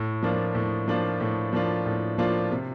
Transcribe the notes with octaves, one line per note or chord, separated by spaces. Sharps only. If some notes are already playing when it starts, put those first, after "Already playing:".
Already playing: A2
F3 A#3 D4 F4
A2
F3 A#3 D4 F4
A2
F3 A#3 D4 F4
A2
F3 A#3 D4 F4
C3